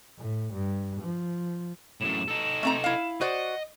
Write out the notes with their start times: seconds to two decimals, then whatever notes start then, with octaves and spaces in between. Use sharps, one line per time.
0.19 A2
0.53 G2
1.01 F3
2.01 F#2 A2 E7
2.28 D#4 A4
2.63 A3 C4 A#5
2.84 E4 F5
3.21 F#4 C5 D5 D#5 F#5